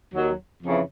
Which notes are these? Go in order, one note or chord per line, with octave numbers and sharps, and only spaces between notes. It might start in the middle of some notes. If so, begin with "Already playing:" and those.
D#2 D#3 F#3
F2 C#3 E3